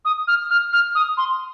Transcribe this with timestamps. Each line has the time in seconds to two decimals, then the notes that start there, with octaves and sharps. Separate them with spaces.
0.05 D#6
0.28 F6
0.50 F6
0.73 F6
0.95 D#6
1.17 C6